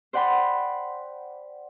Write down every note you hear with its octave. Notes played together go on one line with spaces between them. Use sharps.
C5 D5 F#5 G5 B5 C6